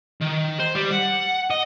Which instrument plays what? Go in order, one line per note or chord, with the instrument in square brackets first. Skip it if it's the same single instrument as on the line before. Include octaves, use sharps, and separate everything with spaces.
[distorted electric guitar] D#3
C5
G3
F#5
D#5